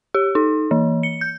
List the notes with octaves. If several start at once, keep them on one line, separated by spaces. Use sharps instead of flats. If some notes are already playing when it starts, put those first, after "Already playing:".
G4
D#4
E3
C#7
G6